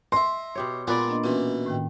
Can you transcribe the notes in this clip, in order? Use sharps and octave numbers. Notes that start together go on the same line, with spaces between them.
D#5 E5 C6
B2 G4 C#5
A#2 G#3 B3 G#4 B4 D5
A#3 D4 D#5
B2 E3 C#4
A2 D#3 G5